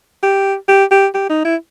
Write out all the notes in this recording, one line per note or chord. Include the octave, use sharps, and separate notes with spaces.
G4
G4
G4
G4
D#4
E4